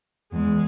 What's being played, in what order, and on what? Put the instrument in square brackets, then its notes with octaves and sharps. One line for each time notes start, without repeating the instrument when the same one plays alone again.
[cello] E2 [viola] G#3